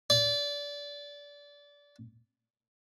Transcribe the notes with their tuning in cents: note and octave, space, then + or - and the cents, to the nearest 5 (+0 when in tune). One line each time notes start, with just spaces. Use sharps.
D5 -25